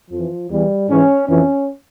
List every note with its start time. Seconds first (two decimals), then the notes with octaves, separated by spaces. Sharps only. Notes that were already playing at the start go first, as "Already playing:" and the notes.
0.10 F2 E3 F3
0.49 E2 E3 G3
0.88 G#2 E3 C#4
1.27 F2 E3 C#4